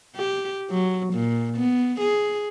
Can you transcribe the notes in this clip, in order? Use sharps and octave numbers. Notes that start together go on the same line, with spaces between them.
G4
F#3
A#2
B3
G#4